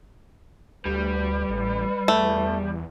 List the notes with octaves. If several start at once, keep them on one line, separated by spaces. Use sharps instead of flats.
D2 G3 B4
A1
E2 A3